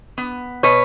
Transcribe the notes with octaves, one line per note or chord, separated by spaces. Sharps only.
B3
B2 B4 C#5